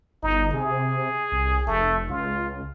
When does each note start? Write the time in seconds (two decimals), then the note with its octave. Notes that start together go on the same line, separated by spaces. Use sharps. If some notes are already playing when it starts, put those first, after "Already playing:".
0.23 G1 D#4
0.53 C3 G#4
1.32 C2
1.67 F1 A3
2.10 C#2 F4